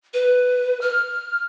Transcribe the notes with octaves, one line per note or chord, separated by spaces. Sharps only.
B4
F6